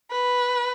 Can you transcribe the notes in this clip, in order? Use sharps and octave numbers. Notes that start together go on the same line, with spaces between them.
B4